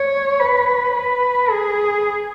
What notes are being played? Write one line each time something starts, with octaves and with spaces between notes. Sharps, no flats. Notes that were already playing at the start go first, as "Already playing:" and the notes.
Already playing: C#5
B4
B4
G#4